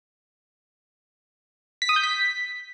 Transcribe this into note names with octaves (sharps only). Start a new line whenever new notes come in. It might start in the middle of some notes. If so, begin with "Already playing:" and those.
B6
D#6
G6
B6